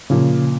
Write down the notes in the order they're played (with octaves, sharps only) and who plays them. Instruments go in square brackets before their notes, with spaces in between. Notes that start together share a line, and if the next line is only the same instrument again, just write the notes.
[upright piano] A#2 F3 A#3 [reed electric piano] C#3